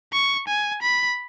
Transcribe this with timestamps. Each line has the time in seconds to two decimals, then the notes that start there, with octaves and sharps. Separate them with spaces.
0.13 C#6
0.48 G#5
0.82 B5